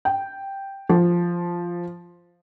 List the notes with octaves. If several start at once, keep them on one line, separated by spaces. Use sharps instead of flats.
G5
F3